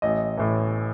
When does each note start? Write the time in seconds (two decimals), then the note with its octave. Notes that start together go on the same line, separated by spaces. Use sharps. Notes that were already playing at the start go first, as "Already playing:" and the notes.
0.02 A1 D#5
0.37 A2 E3